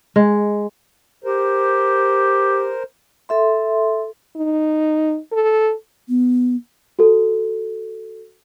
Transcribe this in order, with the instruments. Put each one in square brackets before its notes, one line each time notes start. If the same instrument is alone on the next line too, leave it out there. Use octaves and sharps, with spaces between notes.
[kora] G#3
[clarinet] G4 [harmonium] A#4 C5
[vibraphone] A4 E5 C6
[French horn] D#4
A4
[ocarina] B3
[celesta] F#4 A4